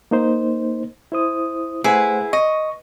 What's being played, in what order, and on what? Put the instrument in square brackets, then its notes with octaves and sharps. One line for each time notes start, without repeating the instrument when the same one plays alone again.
[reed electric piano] A#3 D#4 C5
E4 C5 D#6
[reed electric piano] A3 C5 F#5 [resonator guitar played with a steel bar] E4 G#4 B4
[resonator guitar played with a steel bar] D#5 [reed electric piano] C#6